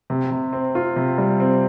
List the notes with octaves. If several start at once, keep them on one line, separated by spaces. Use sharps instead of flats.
C3
C3
C4
F4
C3
G3
C4